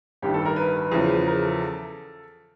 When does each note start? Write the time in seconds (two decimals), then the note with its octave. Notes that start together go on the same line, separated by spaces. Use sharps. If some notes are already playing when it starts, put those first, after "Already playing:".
0.22 A1 G2 D#3 G4
0.34 A4
0.45 A#4
0.56 B4
0.92 E2 C#3 F3
1.27 A#4
1.44 A4